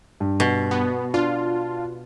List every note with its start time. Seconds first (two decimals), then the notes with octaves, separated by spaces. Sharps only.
0.20 G2
0.40 B2
0.71 B3
1.14 D4 F4